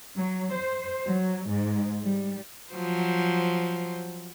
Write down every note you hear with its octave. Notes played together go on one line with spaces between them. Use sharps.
F#3
C5
F#3
G#2
G3
F3 F#3 C5